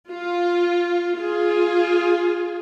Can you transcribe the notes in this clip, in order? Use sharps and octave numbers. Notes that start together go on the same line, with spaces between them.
F4
F4 G#4